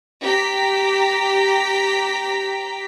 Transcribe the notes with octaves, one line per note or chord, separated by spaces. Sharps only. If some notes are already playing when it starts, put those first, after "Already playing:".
G4 A#5 B6